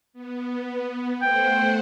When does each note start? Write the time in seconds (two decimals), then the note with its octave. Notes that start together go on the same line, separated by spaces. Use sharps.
0.13 B3
1.22 A3 C5 F#5 G5